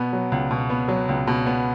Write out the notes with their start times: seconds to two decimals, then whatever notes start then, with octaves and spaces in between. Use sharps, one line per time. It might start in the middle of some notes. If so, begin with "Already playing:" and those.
Already playing: B2 B3
0.13 F#3
0.32 C#2
0.51 B2
0.70 B3
0.88 F#3
1.09 C#2
1.27 B2
1.46 B3